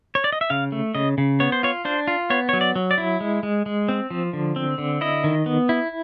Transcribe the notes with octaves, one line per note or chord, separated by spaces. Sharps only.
C#5
D5
D#5
E5
C#3 F5
A3
C#3 D#5
C#3
B3 C#5
C5
F4 C#5
D4 C5
F4
B3 C#5
F#3 C#5
D5
F#3
D5
E4
G#3
G#3
G#3
C4
F3
D3
C4
D3
E4 D#5
D#3
B3
E4